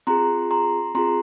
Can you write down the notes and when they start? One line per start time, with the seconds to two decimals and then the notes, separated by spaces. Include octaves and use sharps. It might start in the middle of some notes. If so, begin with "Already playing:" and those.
0.07 C4 F4 G#4 A#5 C6
0.51 A#5 C6
0.95 C4 F4 G#4 A#5 C6